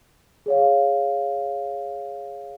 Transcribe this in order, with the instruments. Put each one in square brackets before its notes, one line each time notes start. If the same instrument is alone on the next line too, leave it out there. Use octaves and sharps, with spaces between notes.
[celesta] G#4 C#5 F5